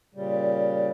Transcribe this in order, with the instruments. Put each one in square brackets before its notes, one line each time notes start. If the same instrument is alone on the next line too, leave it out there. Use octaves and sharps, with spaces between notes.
[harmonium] A#2 C#3 G3